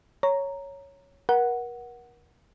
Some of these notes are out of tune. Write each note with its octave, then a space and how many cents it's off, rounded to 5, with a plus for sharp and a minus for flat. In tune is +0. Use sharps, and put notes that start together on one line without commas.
C#5 +0 A#5 -5
A#4 +35 F#5 +0